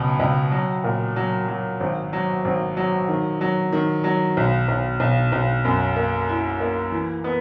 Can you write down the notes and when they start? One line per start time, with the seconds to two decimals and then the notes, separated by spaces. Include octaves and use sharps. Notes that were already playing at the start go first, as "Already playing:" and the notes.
Already playing: C#2 B2 F#3
0.20 C#2
0.51 F#3
0.84 A#2
1.16 F#3
1.48 F#3
1.80 G#1
2.13 F#3
2.45 G#1
2.77 F#3
3.09 D#3
3.41 F#3
3.73 D#3
4.04 F#3
4.37 B1
4.68 B1
5.00 B1
5.32 B1
5.65 F#2
5.96 A#3
6.29 E4
6.60 A#3
6.92 E3
7.24 B3